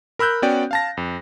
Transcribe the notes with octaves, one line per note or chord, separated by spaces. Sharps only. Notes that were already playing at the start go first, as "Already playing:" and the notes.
A#4 B5 E6 F#6 G6
B3 C#4 F#4 D5 G5
F5 A5 A#6
F2